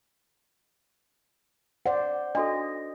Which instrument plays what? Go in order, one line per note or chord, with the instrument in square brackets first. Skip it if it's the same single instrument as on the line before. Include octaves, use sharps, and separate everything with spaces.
[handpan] C5 D5 [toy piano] F#5
[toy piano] D4 F#4 A4 [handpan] D#5